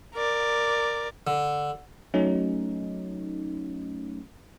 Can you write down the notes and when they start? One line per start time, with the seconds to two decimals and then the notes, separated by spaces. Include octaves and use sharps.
0.15 A#4 D5
1.27 D3
2.14 F#3 A3 C#4 D#4